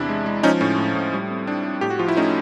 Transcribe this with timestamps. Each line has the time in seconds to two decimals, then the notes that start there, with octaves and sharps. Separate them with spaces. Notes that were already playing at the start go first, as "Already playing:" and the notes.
Already playing: E2 C3 D4 E4
0.09 G#3
0.26 G#3
0.43 F3 C#4 D#4
0.61 A2 C#4
0.78 A2
0.95 A2
1.13 G3
1.30 C4
1.47 C4 D4
1.64 C4
1.81 A2 G4
1.90 F#4
1.99 F3 F4
2.08 E4
2.17 A3 C#4 D#4